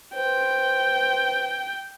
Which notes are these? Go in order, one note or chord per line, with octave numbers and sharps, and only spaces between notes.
B4 C5 G5